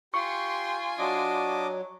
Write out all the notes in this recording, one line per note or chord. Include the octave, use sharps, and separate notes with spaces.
F4 G4 G#5 C6 C#6
F#3 D4 D#5 D6